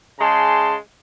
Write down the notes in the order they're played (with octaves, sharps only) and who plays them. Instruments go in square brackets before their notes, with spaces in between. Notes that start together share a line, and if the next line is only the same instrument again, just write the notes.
[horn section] C#3 G#3 A5 C6